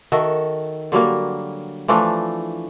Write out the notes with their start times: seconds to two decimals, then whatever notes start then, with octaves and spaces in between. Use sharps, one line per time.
0.12 D#3 F#4 A4 E5
0.92 D3 F#3 G3 A#3
1.88 E3 F3 A3 D4